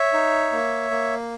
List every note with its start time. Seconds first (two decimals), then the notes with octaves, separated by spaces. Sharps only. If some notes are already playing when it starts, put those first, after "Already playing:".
Already playing: C#5 E5
0.13 D#4
0.52 A#3
0.91 A#3